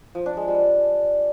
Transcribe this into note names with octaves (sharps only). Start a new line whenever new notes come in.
F3
D4
G#3
G3